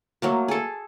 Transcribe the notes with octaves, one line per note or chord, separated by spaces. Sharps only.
F#3 A3 A#3
G#4 A4